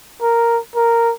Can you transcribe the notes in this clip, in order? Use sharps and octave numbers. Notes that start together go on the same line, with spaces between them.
A#4
A#4